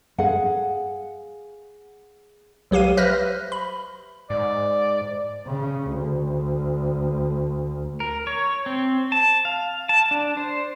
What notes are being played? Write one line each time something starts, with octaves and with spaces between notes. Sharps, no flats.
G#4 F5 F#5
B1 F#3 G4 F5 D#7
B4 C5 E5 F6 F#6 A#6
B5
G#2 D5
C#3
D2
A#4
C#5
C4
A5
F5
A5
D4
C5